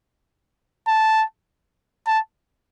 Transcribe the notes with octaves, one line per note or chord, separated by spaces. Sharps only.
A5
A5